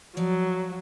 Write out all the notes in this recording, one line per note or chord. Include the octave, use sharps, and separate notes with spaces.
F3 F#3 D5